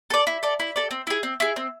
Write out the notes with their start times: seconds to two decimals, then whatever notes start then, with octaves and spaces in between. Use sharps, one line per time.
0.10 A4 D5
0.27 E4
0.43 A4 D5
0.60 E4
0.76 A4 D5
0.91 C4
1.07 E4 G#4
1.23 C4
1.40 E4 G#4
1.56 C4